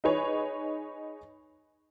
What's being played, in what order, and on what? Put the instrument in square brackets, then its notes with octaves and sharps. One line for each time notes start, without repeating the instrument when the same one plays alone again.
[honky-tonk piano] D#4 G#4 B4 C#5